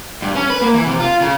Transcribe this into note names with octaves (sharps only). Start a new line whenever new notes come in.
G2
C#4
B4
A#3
E3
C3
F4
C#3